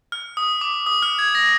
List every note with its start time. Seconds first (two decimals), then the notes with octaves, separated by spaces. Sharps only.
0.12 F6
0.37 D#6
0.61 D6
0.86 D#6
1.02 F6
1.19 G#6
1.35 A#6